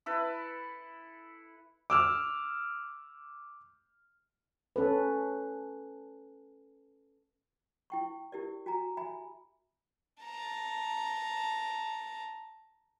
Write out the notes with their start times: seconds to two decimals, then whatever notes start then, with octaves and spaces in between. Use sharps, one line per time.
0.06 E4 A4 B4
1.90 D6 E6 F6
4.76 C#4 A4 B4
7.90 E4 G5 C#6
8.32 E4 G4 A#4 D5
8.66 F#4 G#5 A#5
8.97 E5 G#5 B5
10.23 A5 A#5